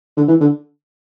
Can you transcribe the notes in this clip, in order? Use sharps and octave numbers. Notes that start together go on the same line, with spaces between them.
D3
E3
D3